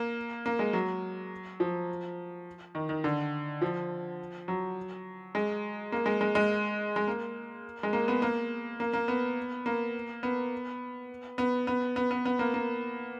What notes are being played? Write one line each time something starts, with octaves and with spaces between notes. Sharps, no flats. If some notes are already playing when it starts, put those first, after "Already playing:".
Already playing: A#3
A#3
G#3
F#3
F3
D#3
D#3
D3
F3
F#3
G#3
A#3
G#3
G#3
G#3
G#3
A#3
G#3
A#3
B3
A#3
A#3
A#3
B3
A#3
B3
B3
B3
B3
B3
B3
A#3
A#3